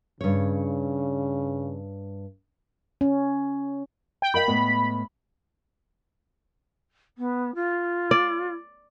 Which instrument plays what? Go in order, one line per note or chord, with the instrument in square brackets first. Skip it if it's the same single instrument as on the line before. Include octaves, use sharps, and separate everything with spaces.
[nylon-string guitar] G2 C#5 [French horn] C#3
[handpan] C#4
[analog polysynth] G5
[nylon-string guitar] A#4 D#5 F5 [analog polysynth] B5
[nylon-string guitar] A2 G#3 B3
[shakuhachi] B3
F4
[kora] D5